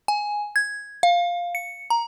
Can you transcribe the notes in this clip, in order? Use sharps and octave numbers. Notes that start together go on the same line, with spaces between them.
G#5
G#6
F5
C#7
A#5